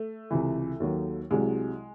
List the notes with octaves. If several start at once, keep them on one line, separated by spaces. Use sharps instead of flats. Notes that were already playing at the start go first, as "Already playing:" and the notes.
Already playing: A3
C#2 C3 E3
D#2 D#3 F#3
C2 C3 F#3 G#3